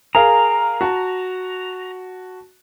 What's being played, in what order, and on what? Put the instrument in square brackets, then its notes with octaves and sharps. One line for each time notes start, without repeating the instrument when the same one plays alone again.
[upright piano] G#4 A#4 F5 [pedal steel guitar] A#5
[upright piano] F#4 A5